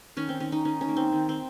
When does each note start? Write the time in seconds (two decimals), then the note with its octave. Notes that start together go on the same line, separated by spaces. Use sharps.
0.17 D#3 C#4
0.29 C4
0.40 D#3 C#4
0.52 D#4
0.65 D#3 C#4
0.81 C#4
0.88 A#3
0.97 C4
1.13 D#3
1.29 C4